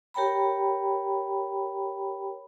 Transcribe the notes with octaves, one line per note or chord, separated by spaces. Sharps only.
G4 A#4 C#5 G5 A#5 B5